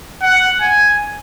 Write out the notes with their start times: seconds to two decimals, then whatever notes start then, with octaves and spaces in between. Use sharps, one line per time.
0.23 F#5
0.61 G#5